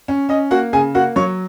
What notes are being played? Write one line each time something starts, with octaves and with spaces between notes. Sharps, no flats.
C#4
C#4 D#5
A#3 F#4 F#5
C#3 G#4 G#5
A#3 F#4 F#5
F#3 C#5 C#6